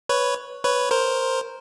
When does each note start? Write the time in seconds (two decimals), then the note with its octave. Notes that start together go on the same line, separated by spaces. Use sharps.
0.09 B4 C#5
0.64 B4 C#5
0.91 A#4 C5